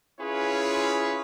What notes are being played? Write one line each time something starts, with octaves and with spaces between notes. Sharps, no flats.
C#4 E4 F4 G#4 B4 C#5